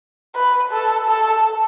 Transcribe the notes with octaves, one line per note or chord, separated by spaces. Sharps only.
B4
A4
A4